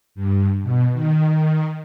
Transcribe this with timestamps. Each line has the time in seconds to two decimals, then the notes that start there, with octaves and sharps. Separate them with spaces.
0.15 G2
0.63 B2
0.93 D#3